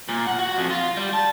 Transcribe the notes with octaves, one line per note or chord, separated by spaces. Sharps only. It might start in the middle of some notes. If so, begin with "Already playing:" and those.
A#2
F#5
F#4
F2
F4
G3
A5